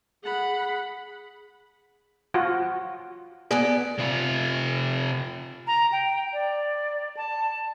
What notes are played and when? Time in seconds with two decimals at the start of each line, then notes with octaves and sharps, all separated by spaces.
0.24 G#4 F#5 B5
2.34 F4 F#4
3.51 B3 G#4 A4 D5
3.98 C3 F4
5.67 A#5
5.92 G5
6.33 D5
7.17 A5